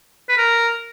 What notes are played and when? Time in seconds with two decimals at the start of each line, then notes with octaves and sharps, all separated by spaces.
0.29 B4
0.38 A#4